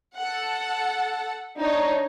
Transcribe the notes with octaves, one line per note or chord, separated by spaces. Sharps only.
A4 F#5
D4 D#4 C#5